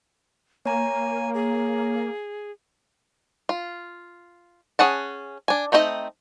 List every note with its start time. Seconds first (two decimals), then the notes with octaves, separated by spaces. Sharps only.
0.66 A#3 C#5 G#5 A#5
1.34 G#4
3.49 F4
4.79 C#4 G#4 F#5 A5
5.48 D4 G#5
5.72 A3 C4 D#4 F#4 D#5